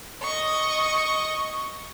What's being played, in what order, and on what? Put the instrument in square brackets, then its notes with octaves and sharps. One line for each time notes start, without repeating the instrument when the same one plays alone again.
[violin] D#5 C#6